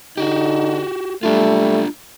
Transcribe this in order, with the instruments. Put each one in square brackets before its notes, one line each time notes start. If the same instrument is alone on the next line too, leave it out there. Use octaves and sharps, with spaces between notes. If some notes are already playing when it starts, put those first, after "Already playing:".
[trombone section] D3 D#4 [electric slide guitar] F#4 G4
[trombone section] G3 A3 [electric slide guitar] D4 F4